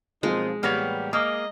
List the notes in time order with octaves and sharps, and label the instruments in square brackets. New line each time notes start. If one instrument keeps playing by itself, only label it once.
[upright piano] B1 F3 C4 [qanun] G#3 [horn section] A#3 D#4 F4
[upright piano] A1 A#6 F7 [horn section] G3 G4 [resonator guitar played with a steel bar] A#3 B3 C#5
[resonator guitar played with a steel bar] A#3 [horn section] G#4 D#5 [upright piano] D6 D#6